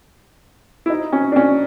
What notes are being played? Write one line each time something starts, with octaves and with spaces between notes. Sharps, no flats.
E4
D#4
C#4
D4
C#4